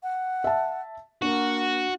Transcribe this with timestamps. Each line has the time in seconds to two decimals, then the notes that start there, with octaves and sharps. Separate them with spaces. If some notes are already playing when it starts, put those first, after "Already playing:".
0.03 F#5
0.44 E5 A5
1.22 A#3 D4 F#4